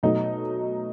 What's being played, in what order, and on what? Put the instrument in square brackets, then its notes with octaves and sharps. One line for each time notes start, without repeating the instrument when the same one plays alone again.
[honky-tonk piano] B2 F#3 A3 D#4